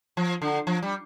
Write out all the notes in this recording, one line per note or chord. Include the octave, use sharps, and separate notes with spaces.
F3
D3
F3
G3